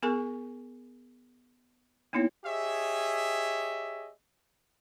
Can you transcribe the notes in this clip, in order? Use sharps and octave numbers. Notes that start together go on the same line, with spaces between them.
B3 G#4 A#4 G#5 C#6
A#3 B3 D#4 E4 C#5
G4 G#4 C#5 D#5 E5